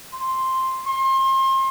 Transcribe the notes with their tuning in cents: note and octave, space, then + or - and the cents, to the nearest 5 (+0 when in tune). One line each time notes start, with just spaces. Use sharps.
C6 +5
C6 +35